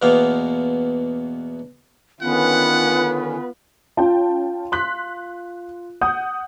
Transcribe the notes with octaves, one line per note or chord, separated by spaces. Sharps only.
E2 B2 A#3 B3 F5
D3 D#3 B3 C#4 F4 B4 F#5
C#4 F4 G5 A5
C6 F#6 B6
F#5 D#6 G6